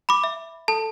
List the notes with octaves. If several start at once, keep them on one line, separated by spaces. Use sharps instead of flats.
B5 D6
E5
A4 A5